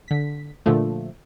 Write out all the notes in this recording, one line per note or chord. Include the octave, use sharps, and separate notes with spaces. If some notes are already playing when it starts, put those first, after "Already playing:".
D3 B6
A#2 D3 F3 A3